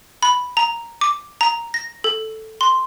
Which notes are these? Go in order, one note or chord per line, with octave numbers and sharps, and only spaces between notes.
B5
A#5
D6
A#5
A#6
A4
C6